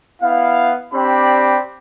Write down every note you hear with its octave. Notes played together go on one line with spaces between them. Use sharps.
B3 E4 F5
C4 D4 G4 D5 B5